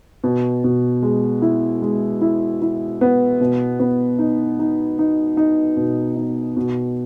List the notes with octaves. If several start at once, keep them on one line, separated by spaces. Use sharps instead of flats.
B2
B2
G#3
E4
G#3
E4
E4
B3
B2
B3
D#4
D#4
D#4
D#4
B2
D#4
B2